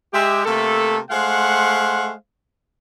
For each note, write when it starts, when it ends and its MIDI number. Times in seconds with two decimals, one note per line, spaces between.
0.12 0.44 56
0.12 0.44 67
0.12 0.44 76
0.45 0.98 48
0.45 0.98 57
0.45 0.98 58
0.45 0.98 69
1.10 2.12 56
1.10 2.12 57
1.10 2.12 72
1.10 2.12 77
1.10 2.12 78